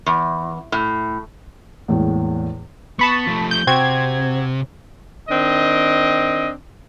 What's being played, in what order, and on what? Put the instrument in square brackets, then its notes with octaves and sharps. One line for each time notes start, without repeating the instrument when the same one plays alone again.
[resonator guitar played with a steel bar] E2
A2
[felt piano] E2 A2 G#3 A#3
[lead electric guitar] B3 [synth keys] A5 B5 C#6
[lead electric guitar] F3 A3
[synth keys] G6
[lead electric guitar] C3 [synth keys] C4 F#4 G#6
[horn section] D#3 C4 D4 D#5